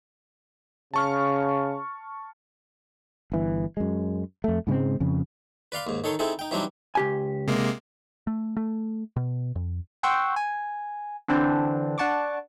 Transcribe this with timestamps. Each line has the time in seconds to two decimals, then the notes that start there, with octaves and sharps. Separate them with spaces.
0.94 C#3 A5 C#6 F6
3.32 G1 E3
3.77 F#2 G#3
4.44 F2 A3
4.67 G#2 C#3 G#3 C4
5.00 F2 C#3
5.72 B4 D5 F5 C6
5.87 D#2 G#2
6.04 D#3 D#4 A4 C#5 C6
6.19 C4 D#4 E4 G#4 A4
6.39 D#4 G5
6.51 E3 F#3 G3 C4 D4 D#4
6.95 C#2 G4 G#5
7.48 C3 G#3 A#3
8.27 A3
8.57 A3
9.16 B2
9.55 F2
10.03 F#5 G5 C6 C#6 E6 G6
10.36 G#5
11.28 D3 E3 C4 D4 C5
11.98 D4 F#5 A5 C#6 D6